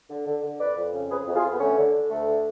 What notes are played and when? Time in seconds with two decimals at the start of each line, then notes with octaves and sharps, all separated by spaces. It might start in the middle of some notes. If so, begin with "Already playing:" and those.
0.10 D3
0.27 D3
0.43 D3
0.60 F2 B4 D5
0.77 F2
0.93 C#3
1.10 F2 G#4 B4
1.27 F2
1.35 F4 G#4
1.44 F2
1.52 B3
1.60 D3 A3 C#4
1.77 D3
1.93 D3
2.10 D2 A3
2.27 D3